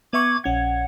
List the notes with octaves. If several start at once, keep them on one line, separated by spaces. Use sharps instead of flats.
B3 E5 C#6 D6 G#6
A#1 C#4 F#5 G#6